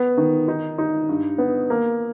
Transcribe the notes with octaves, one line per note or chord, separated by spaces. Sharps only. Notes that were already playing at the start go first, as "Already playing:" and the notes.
Already playing: B3
D#3
D#4
D#4
G2
B3
A#3